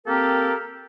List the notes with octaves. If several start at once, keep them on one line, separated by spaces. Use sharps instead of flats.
A#3 C4 G4 A4 A#4